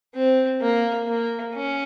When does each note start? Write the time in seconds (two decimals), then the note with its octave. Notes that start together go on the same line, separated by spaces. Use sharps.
0.15 C4
0.61 A#3
1.08 A#3
1.55 C#4